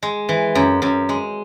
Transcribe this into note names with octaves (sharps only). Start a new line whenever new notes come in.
G#3
E3
F#2
F#2
G#3